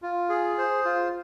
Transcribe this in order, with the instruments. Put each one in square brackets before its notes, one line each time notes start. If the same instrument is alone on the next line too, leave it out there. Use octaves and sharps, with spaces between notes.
[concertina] F4
G#4
C5
F4